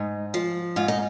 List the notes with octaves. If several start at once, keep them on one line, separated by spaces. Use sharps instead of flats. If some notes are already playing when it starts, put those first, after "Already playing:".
Already playing: G#2 D#4
F3
G#2 F4
D#4